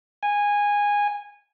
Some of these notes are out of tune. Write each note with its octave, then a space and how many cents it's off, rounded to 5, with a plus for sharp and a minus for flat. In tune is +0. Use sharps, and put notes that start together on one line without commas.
G#5 -15